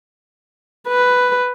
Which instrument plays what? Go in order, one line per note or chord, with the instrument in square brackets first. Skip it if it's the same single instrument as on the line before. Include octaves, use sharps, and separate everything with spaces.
[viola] B4